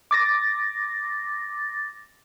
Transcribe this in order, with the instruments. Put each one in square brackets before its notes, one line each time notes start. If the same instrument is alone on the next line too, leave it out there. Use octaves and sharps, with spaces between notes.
[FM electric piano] D6 A6 A#6